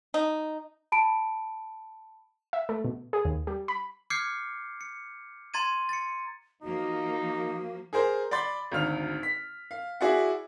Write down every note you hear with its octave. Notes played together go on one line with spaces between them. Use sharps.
D#4
A5 B5 D7
E5
A3
B2
G#4
D#2
G3
B5
D6 F6 G6 G#6 C7 C#7
C#7
A#5 C6 G#6 A6 D#7
A6 C#7
E3 F3 A#3 D#4 F#4
G#4 A#4 C5 A#5
D5 B5 C6 A6
G#1 D2 F6 F7
B6
F5
E4 F#4 G#4 D5 E5 F#5